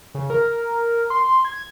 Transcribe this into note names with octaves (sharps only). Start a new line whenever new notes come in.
C#3
A#4
C6
G#6